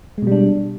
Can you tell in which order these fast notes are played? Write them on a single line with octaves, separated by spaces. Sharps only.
G#3 B2 G3 D4